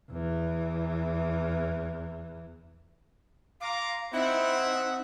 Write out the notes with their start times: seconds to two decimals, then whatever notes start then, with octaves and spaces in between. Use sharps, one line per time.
0.11 E2 E3
3.61 F4 F5 A#5 D6
4.13 C4 D#4 E4 E5 F#5